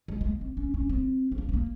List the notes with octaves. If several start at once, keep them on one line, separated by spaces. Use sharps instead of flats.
G#3
G#3
A#3
C4
C#4
C#4
C4
C4
A#3
C4
A#3